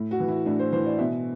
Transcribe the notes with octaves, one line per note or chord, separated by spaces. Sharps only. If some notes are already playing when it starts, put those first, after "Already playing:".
Already playing: A2
F#4
E3
E4
A2 D4
C5
E3 C5
D5
B2 E5